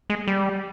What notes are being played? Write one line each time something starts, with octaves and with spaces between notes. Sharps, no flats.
G#3
G3